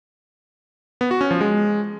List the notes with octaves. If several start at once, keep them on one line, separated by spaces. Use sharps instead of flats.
B3
F#4
C#4
F3
G#3